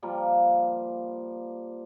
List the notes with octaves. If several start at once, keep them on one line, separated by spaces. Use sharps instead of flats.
F3 G3 A#3